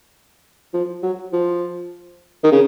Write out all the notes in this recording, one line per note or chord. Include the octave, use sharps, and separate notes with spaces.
F3
F#3
F3
D#3
C#3